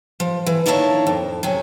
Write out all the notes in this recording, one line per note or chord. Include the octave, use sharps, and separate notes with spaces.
F3
E3
D#3 A#3 D4 E4 C#5 A5
F2
C3 F#3 C#4